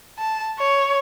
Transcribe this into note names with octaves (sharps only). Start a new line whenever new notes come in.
A5
C#5